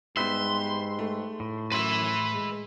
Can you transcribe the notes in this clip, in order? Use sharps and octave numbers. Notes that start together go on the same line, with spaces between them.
G#2 G3 B3 G4 B4 E5 C6
A3
A2
F#2 B4 E5 C6
G#3